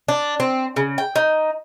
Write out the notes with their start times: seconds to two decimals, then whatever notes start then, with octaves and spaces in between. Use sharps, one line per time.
0.08 D4
0.40 C4
0.76 C#3
0.98 G5
1.16 D#4